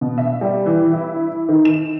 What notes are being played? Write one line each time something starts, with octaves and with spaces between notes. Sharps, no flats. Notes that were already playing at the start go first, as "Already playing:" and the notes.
B2
E5
G3
E3
E4
D#3
E7